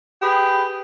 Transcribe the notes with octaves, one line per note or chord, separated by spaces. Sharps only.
G4 G#4 B4